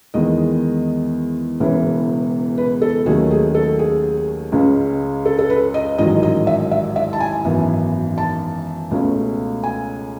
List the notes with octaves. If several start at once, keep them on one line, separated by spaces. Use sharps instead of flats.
E2 D#3 G#3 B3 D#5
E1 E2 C#3 E3 B3
B4
A4
D#2 D#3 F#3 A3 C#4 G#4
G#4
A4
G#4
C#2 C#3 G#3 C#4
A4
A4
B4
D#5
A1 G#2 D#3 F#3 D#5
D#5
E5
E5
E5
A5
G#5
G#1 F#2 E3 B3
A5
C#2 B2 A3 C#4
G#5